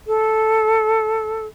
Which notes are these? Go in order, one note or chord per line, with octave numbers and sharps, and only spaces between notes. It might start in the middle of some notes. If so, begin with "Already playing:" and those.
A4